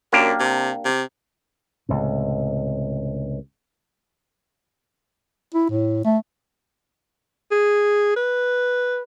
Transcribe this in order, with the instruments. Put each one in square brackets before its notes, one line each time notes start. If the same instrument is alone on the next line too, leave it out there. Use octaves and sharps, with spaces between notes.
[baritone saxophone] F#2 [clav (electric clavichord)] A#3 D4 G4
[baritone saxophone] C3
C3
[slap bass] C#2 A2 C3
[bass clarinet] E4
A2
A3
[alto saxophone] G#4
B4